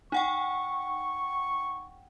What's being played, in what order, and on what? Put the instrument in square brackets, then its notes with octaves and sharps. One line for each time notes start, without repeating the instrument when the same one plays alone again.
[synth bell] D#4 F#5 G5 [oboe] C#6